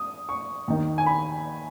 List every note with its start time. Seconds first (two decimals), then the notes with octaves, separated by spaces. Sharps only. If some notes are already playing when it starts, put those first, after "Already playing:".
Already playing: D#6
0.29 C#6
0.68 D#2 D#3
0.98 G#5
1.06 B5